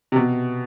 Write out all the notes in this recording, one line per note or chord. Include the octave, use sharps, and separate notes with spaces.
C3
B2